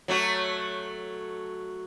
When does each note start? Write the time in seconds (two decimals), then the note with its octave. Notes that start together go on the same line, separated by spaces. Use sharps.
0.08 F#3 A3 F#4